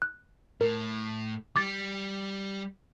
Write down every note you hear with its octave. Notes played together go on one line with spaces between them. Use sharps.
F#6
A2 A#4
G3 D6 G#6 A6